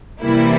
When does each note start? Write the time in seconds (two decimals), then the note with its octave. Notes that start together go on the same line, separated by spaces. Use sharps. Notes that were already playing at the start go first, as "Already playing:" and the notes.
0.22 C3 E3 G3 A#3 E4